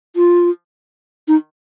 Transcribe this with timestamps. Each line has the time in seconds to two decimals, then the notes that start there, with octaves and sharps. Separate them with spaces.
0.16 F4
1.28 D#4